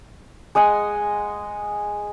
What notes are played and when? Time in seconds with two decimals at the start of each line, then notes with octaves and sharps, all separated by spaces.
0.55 G#3 D#5 F#5 G#5